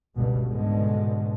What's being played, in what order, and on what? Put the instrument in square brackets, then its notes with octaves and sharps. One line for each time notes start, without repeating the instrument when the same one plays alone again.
[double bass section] G1 C#2 G2 B2
G#2 B2 D3 G#3